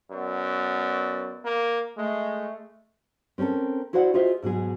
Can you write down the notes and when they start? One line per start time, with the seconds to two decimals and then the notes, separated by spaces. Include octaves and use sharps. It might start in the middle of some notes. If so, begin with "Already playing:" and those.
0.11 F#2 B3 D5
1.45 A#3
1.97 G#3 A3
3.38 C4 C#4 G4 A4 A#4
3.93 E4 F#4 C5 D5 E5 F#5
4.14 F4 F#4 G#4 C5 D#5 E5
4.42 G#2 B2 F#3 G#4